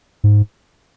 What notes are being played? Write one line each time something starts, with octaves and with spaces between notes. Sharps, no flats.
G#2